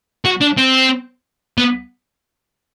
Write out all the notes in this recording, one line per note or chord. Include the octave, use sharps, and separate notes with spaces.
F#4
D4
C4
B3